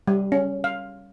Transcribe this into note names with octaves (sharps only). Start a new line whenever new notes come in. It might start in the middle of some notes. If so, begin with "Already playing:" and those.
G3
C#4
F5